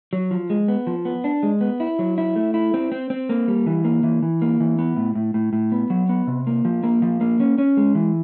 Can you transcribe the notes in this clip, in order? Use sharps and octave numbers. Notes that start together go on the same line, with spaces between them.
F#3
F3
G#3
B3
F3
B3
D4
G#3
B3
E4
F#3
E4
A3
E4
C4
C4
C4
A#3
G3
E3
A#3
E3
E3
A#3
E3
B3
A2
A2
A2
A2
B3
F#3
B3
C3
A#3
F3
A#3
F3
A#3
C#4
C#4
G#3
E3